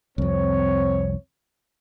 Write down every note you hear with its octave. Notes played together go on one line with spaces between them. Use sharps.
C2 F2 C4 C#5